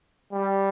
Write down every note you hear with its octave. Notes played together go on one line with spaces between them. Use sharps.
G3